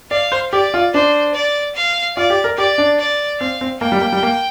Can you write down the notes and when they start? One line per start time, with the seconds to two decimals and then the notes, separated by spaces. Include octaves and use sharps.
0.11 D5 F5
0.32 C5
0.52 G4 D5
0.74 F4
0.94 D4 C5
1.35 D5
1.75 F5
2.17 F4 D5
2.30 G4
2.44 A#4
2.58 G4 D5
2.78 D4
2.99 D5
3.40 C4 F5
3.61 C4
3.81 A#3 G5
3.92 G3
4.01 A#3
4.13 G3
4.23 A#3